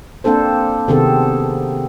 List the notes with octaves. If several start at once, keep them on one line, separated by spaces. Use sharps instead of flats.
A#3 C4 D4 A4 C5
C3 D#3 B3 C4 G#4 A4